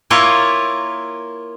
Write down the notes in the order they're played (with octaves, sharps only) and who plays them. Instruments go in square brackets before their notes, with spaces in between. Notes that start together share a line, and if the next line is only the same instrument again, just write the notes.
[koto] A#3 E4 F4 A#4 C#5